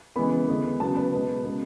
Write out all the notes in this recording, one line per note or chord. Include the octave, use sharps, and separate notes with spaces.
C#3 E3 G#3 B3 B5
D3 G#3 B3
C#3 F#3 B3 A5
B4
B2 G#3 B3
C#3 G#3 B3